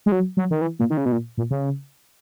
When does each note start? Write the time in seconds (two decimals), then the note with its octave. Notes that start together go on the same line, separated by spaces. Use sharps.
0.06 G#3
0.12 F#3
0.37 F#3
0.51 D#3
0.61 E3
0.79 A#2
0.90 D#3
0.97 C#3
1.06 B2
1.12 A#2
1.38 A#2
1.51 C#3